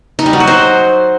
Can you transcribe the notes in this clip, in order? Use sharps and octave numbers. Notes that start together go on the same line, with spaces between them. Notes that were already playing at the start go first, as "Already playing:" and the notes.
D#4
G3
F#3
F#4
C5